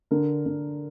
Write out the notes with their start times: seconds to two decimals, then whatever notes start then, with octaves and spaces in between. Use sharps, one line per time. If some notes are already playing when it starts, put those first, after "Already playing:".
0.11 D3 A#4
0.46 D3